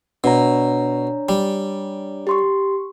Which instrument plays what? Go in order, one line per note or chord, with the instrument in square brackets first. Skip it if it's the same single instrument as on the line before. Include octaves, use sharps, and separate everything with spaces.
[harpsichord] B2 [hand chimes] D4 C#5 A#5
[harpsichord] G3
[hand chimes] G4 C6 C#6